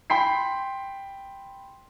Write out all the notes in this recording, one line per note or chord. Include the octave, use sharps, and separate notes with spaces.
G5 B5 C6 B6 C7